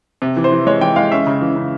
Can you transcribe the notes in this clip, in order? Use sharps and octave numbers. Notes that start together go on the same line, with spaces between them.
C3
E3
C5
E3
G#3 C#5
E3 G5
G#3 F5
C#4 E5
C#3
E3
C#3